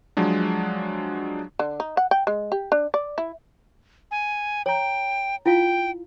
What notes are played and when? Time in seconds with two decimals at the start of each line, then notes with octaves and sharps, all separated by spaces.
0.17 F3 F#3 G#3 D4
1.59 D3
1.80 D#4
1.97 F#5
2.11 G5
2.27 G#3
2.52 G4
2.72 D4
2.94 D5
3.18 E4
4.11 G#5
4.66 C#5 G5 A#5
5.46 E4 F4 F5 G5